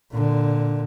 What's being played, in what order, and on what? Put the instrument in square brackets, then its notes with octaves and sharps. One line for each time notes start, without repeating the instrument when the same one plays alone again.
[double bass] A#2 D3